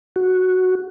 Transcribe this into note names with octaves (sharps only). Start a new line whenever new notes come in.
F#4